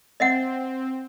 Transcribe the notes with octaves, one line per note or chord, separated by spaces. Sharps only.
C4 D#5 E5 F#5